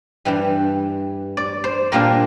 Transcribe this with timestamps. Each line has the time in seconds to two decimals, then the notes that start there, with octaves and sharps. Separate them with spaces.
0.25 G2 E3 G3
1.37 D5
1.64 C5
1.92 A#2 G3 A#3 D4 A#4